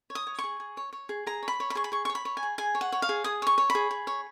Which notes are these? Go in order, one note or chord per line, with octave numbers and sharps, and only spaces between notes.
C#5
D#6
C#5
C#6
G#4
G#4
C#5
C#5
G#4
G#4 A#5
C#5
B5
C#5
B5
G#4 C#6
B5
G#4 C#6
C#5 C#6
B5
C#5
G#5
G#4
G#4 G#5
C#5
F#5
C#5
F5
G#4
G#4 D#6
C#5 C#6
C#5
B5
G#4
G#4
C#5